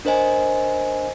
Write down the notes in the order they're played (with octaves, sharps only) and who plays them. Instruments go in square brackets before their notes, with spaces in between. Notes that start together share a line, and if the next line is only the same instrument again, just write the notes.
[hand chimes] D4 A#4 C5 D#5 G#5